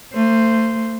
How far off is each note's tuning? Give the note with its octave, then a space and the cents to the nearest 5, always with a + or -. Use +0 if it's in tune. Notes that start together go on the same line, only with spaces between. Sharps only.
A3 +35 C5 +0